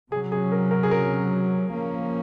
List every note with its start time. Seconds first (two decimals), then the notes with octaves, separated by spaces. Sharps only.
0.11 C3 F#3 C#4 G#4
0.32 G#4
0.52 A#4
0.71 A#4
0.83 G#4
0.91 A#4
1.71 F3 A#3 C#4